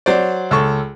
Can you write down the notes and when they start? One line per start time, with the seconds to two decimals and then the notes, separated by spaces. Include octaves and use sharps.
0.06 F#3 C5 D5
0.51 C#2 A4 C#6